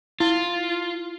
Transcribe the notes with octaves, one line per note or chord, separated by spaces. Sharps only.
E4 F4